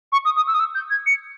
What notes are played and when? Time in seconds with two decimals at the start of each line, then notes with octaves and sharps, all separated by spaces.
0.12 C#6
0.25 D#6
0.36 D#6
0.47 E6
0.54 D#6
0.59 E6
0.74 G6
0.90 G#6
1.06 C#7